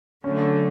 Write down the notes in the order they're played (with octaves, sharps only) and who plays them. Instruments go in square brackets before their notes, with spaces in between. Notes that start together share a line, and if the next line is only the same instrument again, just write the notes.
[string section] D3 F#3 A3 [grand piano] C#4